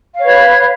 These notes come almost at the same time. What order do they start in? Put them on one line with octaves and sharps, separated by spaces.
F5 C#5 B4